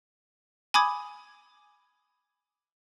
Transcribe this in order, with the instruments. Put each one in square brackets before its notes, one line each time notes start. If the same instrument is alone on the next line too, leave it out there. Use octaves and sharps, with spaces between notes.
[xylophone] G#5 B5 D6 D#6 G#6